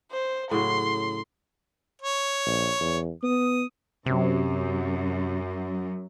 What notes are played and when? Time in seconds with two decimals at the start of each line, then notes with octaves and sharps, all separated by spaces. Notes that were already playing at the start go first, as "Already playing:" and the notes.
0.12 C5
0.51 A2 C#3 F#3 C6
2.01 C#5
2.46 A#1
2.81 E2
3.23 B3 D#6
4.06 F#2 C3